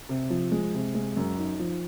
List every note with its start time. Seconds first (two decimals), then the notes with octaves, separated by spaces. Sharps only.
0.09 C3
0.30 F3
0.52 G#3
0.74 C3
0.94 G#3
1.17 F#2
1.38 D#4
1.59 F3